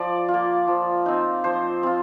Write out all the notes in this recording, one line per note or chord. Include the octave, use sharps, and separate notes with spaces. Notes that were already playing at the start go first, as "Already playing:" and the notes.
Already playing: F3 D5
F4
A#3
F3
C4 D#4
F3 C5
C4 F4